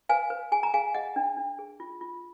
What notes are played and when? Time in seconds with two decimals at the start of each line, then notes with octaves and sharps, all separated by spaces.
0.09 B4 F5 G#5
0.30 B4
0.52 G#4 G#5
0.63 A#5
0.74 G#4 F5 G#5
0.94 G#4 D#5 F#5
1.16 D4
1.37 D4
1.59 G#4
1.80 F4
2.01 F4